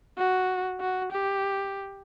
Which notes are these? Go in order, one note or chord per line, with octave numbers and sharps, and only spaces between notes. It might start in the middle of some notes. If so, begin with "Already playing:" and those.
F#4
F#4
G4